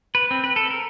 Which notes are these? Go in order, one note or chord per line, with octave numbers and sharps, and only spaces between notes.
B4
C4
B4
A4
A#4